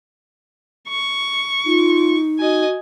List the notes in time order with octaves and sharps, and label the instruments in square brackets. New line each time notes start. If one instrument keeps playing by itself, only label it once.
[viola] C#6
[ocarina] D#4 [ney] F4
[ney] F#4 [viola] D#5 G#5